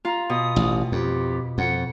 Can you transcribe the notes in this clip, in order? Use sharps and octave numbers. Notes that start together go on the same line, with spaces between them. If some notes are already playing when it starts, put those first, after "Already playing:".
F4 A#5
B2 D#6
A1
F2 G4
F2 F#5